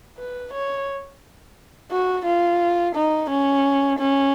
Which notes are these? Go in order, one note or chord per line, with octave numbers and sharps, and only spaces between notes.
B4
C#5
F#4
F4
D#4
C#4
C#4